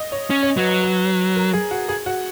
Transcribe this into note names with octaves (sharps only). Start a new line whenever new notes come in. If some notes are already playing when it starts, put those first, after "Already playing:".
Already playing: D#5
C#5
C#4
C#5
F#3 B4
B4
B4
A#4
G#4
F#4
G#4
F#4